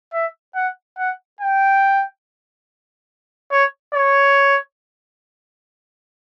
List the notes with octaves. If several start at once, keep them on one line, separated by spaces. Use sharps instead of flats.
E5
F#5
F#5
G5
C#5
C#5